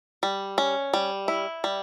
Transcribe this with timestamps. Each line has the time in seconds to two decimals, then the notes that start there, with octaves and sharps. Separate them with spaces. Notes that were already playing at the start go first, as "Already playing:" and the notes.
0.23 G3
0.58 C#4
0.94 G3
1.28 E4
1.64 G3